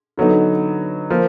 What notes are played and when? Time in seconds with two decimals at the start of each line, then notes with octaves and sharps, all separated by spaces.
0.18 D3 F#3 B3 D#4
1.10 F3 A#3